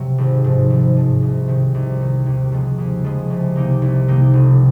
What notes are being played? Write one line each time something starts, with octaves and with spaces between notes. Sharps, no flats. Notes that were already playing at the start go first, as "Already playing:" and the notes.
Already playing: C3 F#3
G#1
G#2 F3
G#1
G#2 F3
C2
C3 D#3
C2
C3 D#3
D#2
C#3 F3 G#3
D#2
C#3 F3 G#3
C2
C3 D#3 A#3 D#4
C2
C3 D#3 A#3 D#4
F1